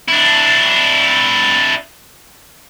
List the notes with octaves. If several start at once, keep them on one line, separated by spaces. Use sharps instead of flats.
D4 E4